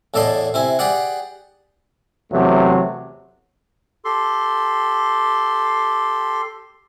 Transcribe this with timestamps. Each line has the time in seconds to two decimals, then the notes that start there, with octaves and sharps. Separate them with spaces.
0.14 E2 A2 A4 D5 D#5 C6
0.54 C3 E4 G#5
0.79 G4 G#4 D5 F#5
2.32 E2 C3 F#3 A3
4.05 G4 A4 C6